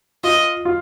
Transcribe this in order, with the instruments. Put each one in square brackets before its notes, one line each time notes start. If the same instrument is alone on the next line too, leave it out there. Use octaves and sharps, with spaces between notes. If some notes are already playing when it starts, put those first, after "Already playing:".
[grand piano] F4 [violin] D#5
[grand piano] F4